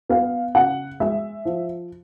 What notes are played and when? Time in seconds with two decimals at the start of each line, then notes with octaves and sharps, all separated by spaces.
0.09 B3 F5
0.55 C#3 F#5
1.00 G#3 E5
1.45 F3